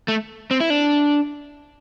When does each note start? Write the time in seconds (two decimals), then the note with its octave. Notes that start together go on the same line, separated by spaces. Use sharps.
0.08 A3
0.51 C4
0.60 E4
0.70 D4